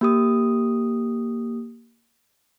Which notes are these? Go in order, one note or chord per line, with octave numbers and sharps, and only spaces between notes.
A#3 G4 D#6